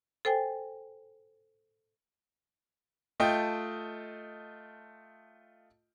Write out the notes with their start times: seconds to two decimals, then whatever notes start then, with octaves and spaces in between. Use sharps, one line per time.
0.25 A4 C5 G5 G#5
3.20 A3 F4 D#5 G5